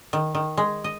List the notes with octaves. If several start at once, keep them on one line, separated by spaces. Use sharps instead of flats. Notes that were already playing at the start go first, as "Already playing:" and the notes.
D#3
D#3
G#3
D#5